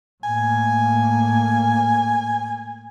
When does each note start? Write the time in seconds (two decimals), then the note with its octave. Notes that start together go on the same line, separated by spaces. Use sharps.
0.24 A2 A#3 G#5